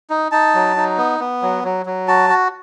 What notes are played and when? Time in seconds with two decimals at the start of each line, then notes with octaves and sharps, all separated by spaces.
0.10 D#4
0.32 D#4 A5
0.54 F#3
0.76 D#4
0.98 B3
1.20 B3
1.42 F#3
1.64 F#3
1.86 F#3
2.08 F#4 A5
2.30 F#4